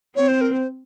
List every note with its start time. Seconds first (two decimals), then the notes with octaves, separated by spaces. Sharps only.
0.16 C4 C#5
0.28 C5
0.41 A#4
0.52 C5